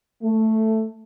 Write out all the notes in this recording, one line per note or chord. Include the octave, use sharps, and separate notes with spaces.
A3